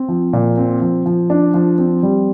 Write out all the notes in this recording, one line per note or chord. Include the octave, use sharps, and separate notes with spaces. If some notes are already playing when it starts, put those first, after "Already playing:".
Already playing: C4
F3
A#2
C4
F3
F3
D4
F3
C4
G3